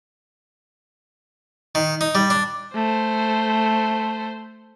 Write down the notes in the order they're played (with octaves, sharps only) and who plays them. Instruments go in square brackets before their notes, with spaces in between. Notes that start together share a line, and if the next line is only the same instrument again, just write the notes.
[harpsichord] D#3
D#4
G3
D4
[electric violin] A3 C5